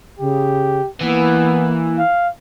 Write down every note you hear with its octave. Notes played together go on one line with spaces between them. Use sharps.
C#3 G4
E3 A#3 B3
F5